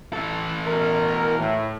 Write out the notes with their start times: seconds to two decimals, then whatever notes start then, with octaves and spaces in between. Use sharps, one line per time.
0.13 E3 A4
0.66 B2 A#4
1.38 A2